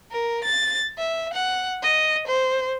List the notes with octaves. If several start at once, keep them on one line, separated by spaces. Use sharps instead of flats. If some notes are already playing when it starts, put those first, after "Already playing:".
A#4
A6
E5
F#5
D#5
C5